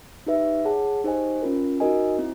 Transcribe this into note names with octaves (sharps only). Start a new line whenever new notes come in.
D#4 G4 B4 E5
G#4 C#5 F#5 A5
D#4 G4 C5 D#5 G#5
C#4 F4 A#4
D#4 F#4 A#4 D#5 G#5
C4 E4